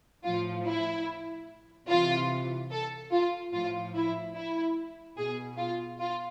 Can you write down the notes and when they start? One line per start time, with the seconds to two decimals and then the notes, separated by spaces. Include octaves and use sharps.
0.24 A2 F3 F4
0.66 E4
1.88 C3 E3 F4
2.71 A4
3.12 F4
3.53 A2 F3 F4
3.95 E4
4.35 E4
5.17 B2 G#4
5.58 F4
6.00 F4